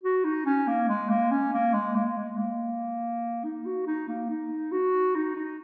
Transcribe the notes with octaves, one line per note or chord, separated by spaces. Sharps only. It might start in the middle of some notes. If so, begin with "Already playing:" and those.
F#4
D#4
C#4
A#3
G#3
A#3
C#4
A#3
G#3
A#3
A#3
G#3
A#3
D#4
F#4
D#4
A#3
D#4
F#4
D#4
D#4